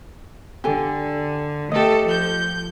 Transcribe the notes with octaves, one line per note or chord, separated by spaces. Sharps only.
D3 G4 A4 G#5
A3 G4 A4 D#5
F3 G6